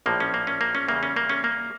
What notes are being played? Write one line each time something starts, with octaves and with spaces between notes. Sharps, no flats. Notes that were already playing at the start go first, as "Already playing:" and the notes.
A#1 A2 F3 A#3
C#4
A#3
C#4
A#3
C#4
E2 C#3 G3 A#3
C#4
A#3
C#4
A#3